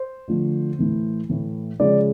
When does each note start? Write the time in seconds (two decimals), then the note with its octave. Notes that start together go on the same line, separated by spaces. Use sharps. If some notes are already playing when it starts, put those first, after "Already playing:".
Already playing: C5
0.28 D3 F3 A3
0.79 A2 E3 A3
1.30 A2 E3 A3
1.80 C#3 F3 G#3 D5